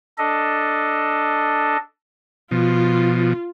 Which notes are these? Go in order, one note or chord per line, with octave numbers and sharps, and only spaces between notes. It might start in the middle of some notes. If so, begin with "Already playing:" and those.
D4 A4 D#5
B2 F3 F4